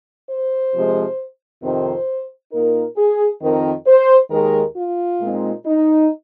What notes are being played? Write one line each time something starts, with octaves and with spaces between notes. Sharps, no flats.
C5
C3 F3 G#3
F2 C3 D#3 C4 D#4 C5
A#2 A#3 D#4 A#4
G#4
F2 D#3 C4 D#4 A#4
C5
D#2 D#3 G#3 A#4
F4
A#2 G#3 C4 D#4
D#4